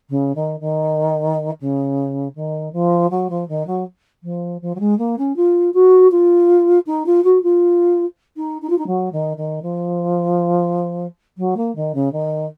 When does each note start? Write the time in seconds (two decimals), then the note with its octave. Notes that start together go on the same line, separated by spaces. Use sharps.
0.10 C#3
0.35 D#3
0.60 D#3
1.61 C#3
2.35 D#3
2.73 F3
3.11 F#3
3.30 F3
3.49 D#3
3.67 F#3
4.24 F3
4.62 F3
4.75 F#3
4.80 G#3
4.99 A#3
5.18 C#4
5.36 F4
5.74 F#4
6.11 F4
6.87 D#4
7.06 F4
7.24 F#4
7.43 F4
8.37 D#4
8.62 D#4
8.70 F4
8.78 D#4
8.87 F#3
9.13 D#3
9.37 D#3
9.63 F3
11.38 F#3
11.57 A#3
11.76 D#3
11.95 C#3
12.13 D#3